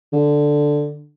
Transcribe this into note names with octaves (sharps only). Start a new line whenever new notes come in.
D3